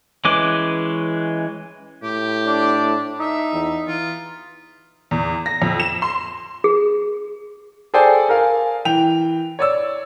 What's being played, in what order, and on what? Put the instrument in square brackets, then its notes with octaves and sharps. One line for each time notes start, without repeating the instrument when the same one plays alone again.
[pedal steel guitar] E3 G#3 C#4 B4 D6
[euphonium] A2 [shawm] G4
[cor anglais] D4
[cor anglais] D#4 [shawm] E5
[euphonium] E2
[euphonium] E3 [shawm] F4
[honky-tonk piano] E2
A#6
F2
E7
C6
[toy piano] G#4
[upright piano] G#4 A4 C5 D5 G5 G#5
A#4 F5 G#5
E3 G5 F7
C#5 D5 E6